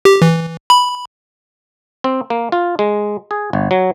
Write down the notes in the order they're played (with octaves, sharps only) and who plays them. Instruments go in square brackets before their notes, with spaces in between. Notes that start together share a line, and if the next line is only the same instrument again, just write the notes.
[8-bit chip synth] G4
E3
B5
[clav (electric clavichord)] C4
A#3
F4
G#3
G#4
G1
F#3